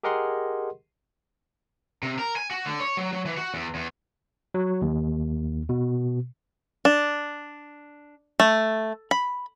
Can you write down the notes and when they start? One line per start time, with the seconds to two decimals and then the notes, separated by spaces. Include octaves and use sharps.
0.03 G4 G#4 A#4 D#5 F#5 C6
2.03 C3
2.19 A#4
2.36 G#5
2.51 F#4
2.66 D3
2.80 C#5
2.97 F#3
3.13 F#3
3.26 E3
3.37 F#4
3.54 E2
3.75 E2
4.54 F#3
4.82 D#2
5.69 B2
6.85 D4
8.40 A3
9.11 B5